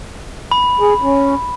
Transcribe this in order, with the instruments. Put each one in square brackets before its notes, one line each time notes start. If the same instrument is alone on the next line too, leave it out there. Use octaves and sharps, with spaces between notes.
[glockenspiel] B5
[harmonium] G#4
C#4